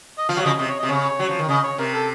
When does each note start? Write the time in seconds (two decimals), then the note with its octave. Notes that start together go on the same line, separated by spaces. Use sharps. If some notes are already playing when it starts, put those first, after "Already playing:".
0.18 D#5
0.29 F3 F5
0.37 F#3 C#5
0.44 C#3 F3 D#5
0.58 C3 D#5
0.69 C#5
0.79 D#5
0.83 C3
0.89 C#3 C#5
1.19 F#3
1.29 F3
1.39 D#3
1.49 C#3 D#5
1.64 C#5
1.78 C3 A#4
1.94 A4